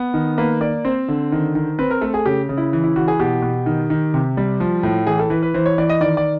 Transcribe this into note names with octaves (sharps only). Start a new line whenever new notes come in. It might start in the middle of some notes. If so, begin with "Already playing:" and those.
Already playing: B3
D#3
A#3 B4
A#3 D5
C4 C5
D3
D#3
D#3
C4 B4
A#4
A3 A4
G#4
C#3 G4
C#3
E4
E3
E4
E3 F#4
G#4
B2 G4
B2
D#3
D#3
C3
G3
F3
A2
E3 G#4
A4
E3 B4
B4
E3 C5
C#5
E3 D5
D#5
D#3 D5
D5